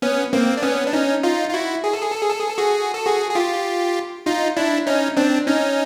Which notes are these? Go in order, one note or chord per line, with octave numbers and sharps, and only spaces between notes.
B3 C#4
A#3 C4
D4
B3 C#4
D4
C#4 D#4
D#4 F4
F4
E4 F#4
G#4
A4
G#4
A4
G#4
A4
G#4
A4
F#4 G#4
A4
F#4 G#4
G#4
F4 G4
D#4 F4
D4 E4
C#4 D#4
C4 D4
C#4 D#4